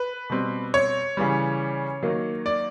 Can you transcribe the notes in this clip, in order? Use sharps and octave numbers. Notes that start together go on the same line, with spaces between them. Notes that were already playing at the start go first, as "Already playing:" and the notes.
Already playing: B4
B2 G3 C4
C#5
C#3 E3 G3
D#3 F#3 A#3
D5